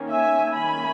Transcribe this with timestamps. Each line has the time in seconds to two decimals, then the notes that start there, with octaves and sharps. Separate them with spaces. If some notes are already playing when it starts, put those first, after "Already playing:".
Already playing: D#3 A#3 C#4
0.11 E5 G#5
0.54 D#3 A#3 C#4 G#5 B5